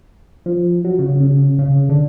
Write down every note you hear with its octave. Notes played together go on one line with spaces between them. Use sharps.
F3
F#3
C#3
C#3
C#3
D3